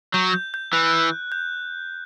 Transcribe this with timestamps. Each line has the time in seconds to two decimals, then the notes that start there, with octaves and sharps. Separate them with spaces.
0.14 F#3 G6
0.34 G6
0.54 G6
0.73 E3 F#6
1.32 G6